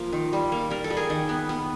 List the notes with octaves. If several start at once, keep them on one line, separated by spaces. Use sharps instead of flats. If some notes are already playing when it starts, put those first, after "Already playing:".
Already playing: F3 A#3 F4
D#3
G3
A#3
G3 A#4
A4
G3
G#4 A#4
D#3
B3
B3